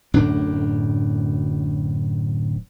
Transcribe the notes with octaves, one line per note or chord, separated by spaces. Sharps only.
D1 F#2 A2 D4